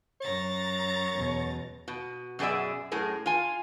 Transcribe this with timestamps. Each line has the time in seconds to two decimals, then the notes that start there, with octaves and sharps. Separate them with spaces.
0.21 F#2 C#5 A#5 A6
1.14 E2 B2
1.88 B2
2.39 F#2 B2 G#4 D5 E5
2.92 F#2 A2 G#4 A#4
3.26 F4 G#5